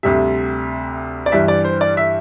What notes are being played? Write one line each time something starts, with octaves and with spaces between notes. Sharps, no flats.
D2 C3 G3 E5
D5
G2 E3 G3 E5
D5
C5
D5
E5